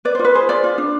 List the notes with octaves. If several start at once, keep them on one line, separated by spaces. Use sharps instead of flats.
B4 D5
F4 C5
B4
G#4 C5
F4 D5
F4
D4